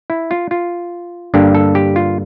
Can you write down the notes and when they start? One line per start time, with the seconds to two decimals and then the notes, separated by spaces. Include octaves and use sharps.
0.10 E4
0.31 F4
0.51 F4
1.34 G2 D3 G3 A#3 D4 G4
1.55 A4
1.75 G4
1.96 F4